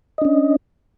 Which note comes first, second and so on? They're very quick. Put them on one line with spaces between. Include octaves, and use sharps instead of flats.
D#5 D4 C#4